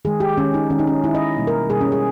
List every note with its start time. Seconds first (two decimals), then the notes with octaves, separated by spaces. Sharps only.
0.05 D#3 G#3 G#4
0.20 G4
0.37 D#3 G#3 C#4
0.54 D#4
0.70 D#3 G#3 C#4
0.79 D#4
0.87 C#4
1.04 D#3 G#3 E4
1.15 D#5
1.37 B2 G3 A#3
1.47 A#4
1.70 B2 G3 A#3 G#4
1.81 C#4
1.92 G#4